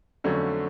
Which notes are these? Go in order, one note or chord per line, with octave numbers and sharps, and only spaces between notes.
F2 D3 F#3 A3 C#4